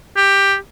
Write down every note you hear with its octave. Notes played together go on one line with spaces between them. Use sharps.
G4